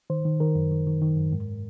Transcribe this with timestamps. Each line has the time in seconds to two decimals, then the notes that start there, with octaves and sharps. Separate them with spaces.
0.10 D#3 C5
0.25 D#3
0.40 D#3 A#4
0.55 F#2
0.71 D#3
0.87 D#3
1.02 D#3
1.17 F#2
1.32 G#2